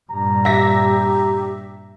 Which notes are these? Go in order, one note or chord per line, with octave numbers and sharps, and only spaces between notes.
G2 A#2 A#5
G4 E5 A#6 B6